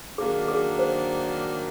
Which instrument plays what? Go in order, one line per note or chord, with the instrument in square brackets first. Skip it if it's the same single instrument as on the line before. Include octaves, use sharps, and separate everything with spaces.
[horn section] D#3 F#3 A#3 D4 [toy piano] G#4
[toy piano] G#4
C5